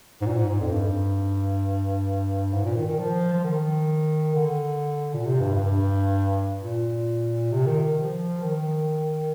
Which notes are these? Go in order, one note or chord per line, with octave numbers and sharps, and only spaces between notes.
G#2
A#2
G#2
G#2
F2
G2
G#2
A#2
D#3
D#3
F3
F3
D#3
D3
A#2
C3
G2
G2
A#2
C3
D#3
F3
D#3